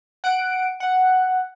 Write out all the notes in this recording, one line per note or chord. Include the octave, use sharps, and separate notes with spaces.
F#5 D7
F#5